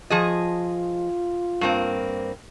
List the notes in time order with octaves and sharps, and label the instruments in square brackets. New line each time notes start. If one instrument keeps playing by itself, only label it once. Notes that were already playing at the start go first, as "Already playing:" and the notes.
[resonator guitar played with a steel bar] F3 G#4 D#5 [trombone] F4
[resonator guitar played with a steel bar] G2 A#3 C4